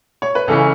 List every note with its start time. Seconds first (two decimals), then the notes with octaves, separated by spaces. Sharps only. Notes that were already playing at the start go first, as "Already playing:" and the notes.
0.22 C#5
0.35 B4
0.47 C#2 C#3 E3 C#4 A4